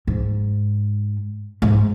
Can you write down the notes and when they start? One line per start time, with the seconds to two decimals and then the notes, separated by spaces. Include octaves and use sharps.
0.07 G#2
1.62 G#2